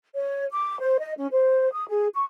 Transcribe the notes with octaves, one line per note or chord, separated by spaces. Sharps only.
C#5
D6
C5
D#5
C#4
C5
D#6
G#4
C#6